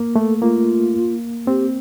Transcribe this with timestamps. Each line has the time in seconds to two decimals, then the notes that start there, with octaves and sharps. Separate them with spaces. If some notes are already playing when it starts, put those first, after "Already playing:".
Already playing: A#3
0.16 A3 A4
0.42 A#3 F4
1.47 C4 G4